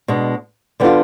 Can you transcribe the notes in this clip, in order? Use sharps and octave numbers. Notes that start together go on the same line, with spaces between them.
B2 G#3 B3 D4
D3 G3 B3 D4 F4